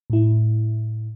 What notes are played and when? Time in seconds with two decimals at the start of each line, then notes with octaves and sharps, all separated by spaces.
0.10 A2 E4